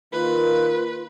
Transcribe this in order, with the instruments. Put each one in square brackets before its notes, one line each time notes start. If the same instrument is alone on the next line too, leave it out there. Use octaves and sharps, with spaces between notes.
[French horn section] D#3 A#3 A#4 [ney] F4 [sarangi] B4